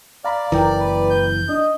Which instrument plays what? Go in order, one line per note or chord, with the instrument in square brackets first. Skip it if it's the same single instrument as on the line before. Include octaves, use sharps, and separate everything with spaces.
[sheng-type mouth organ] D5 [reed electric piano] F5 A#5 B5
[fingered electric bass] F#1 E3 [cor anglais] A#4 [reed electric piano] G5 A#5
[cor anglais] B4
[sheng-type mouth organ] G6
[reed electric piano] D4 [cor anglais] D#5